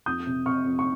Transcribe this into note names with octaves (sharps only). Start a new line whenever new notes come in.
F2 D#6 G6
C3
C3 C#6 F6
F2
C#6